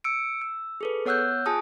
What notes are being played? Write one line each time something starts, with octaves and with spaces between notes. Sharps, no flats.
E6 C#7 D7
E6
G#4 A4 B4
B3 C#5 F#5 E6 F#6 G6
F4 G#4 G#5 A5 D#6